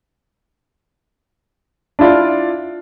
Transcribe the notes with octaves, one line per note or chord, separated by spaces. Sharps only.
D4 E4 F4 D5